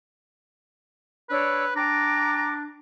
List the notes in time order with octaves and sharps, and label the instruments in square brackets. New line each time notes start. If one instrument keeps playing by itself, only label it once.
[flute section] D4 C#5 E6 [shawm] B4
[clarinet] D4 [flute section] G5 D6 [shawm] A#5